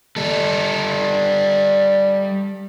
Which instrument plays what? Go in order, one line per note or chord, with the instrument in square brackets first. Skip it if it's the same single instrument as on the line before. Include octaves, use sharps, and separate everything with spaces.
[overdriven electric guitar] G3 A4